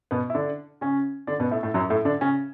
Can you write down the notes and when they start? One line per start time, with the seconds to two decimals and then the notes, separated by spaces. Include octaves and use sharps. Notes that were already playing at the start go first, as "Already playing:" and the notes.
0.11 B2 B3
0.30 E4
0.35 D3 D4
0.81 C#3 C#4
1.27 D3 D4
1.40 B2 B3
1.51 A2 A3
1.63 A2 A3
1.74 F#2 F#3
1.90 A2 A3
2.05 D3 D4
2.21 C#3 C#4